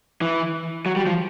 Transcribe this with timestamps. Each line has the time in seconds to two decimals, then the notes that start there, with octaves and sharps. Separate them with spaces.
0.21 E3
0.86 F#3
0.96 G3
1.07 F3